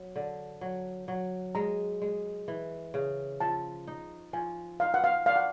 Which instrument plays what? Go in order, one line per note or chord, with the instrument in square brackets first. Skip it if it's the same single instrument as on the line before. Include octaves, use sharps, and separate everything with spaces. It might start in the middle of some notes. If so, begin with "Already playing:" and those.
Already playing: [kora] F#3
D3
F#3
F#3
[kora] G#3 [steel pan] A#5
[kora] G#3
E3
C#3
[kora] F3 [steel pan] A5
[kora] D#4
[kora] F3 [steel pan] G#5
[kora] D#4 [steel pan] F5
[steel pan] F#5
F5
[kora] D4 [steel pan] F5
[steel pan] F#5